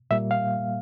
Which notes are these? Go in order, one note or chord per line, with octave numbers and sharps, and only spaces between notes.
A#2 G3 A#3 E5
F5